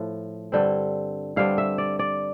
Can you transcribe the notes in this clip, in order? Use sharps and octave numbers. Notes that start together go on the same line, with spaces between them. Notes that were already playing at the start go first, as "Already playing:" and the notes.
Already playing: A2 F3
G2 D3 G3 C4
G2 D3 G3 C4 F5
E5
D5
D5